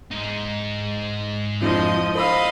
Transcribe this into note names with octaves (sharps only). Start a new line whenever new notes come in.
G#2 D#4
F2 F3 D4 E4 D#5
C5 D#5 F5 B5 E6